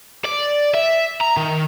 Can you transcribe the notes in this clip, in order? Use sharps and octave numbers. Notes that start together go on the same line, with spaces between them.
D5
E5
A#5
D#3